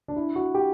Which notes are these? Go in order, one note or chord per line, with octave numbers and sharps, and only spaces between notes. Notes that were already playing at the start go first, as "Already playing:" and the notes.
D4
E4
F#4
G4